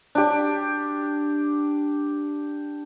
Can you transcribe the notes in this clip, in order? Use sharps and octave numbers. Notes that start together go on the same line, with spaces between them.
D4 G4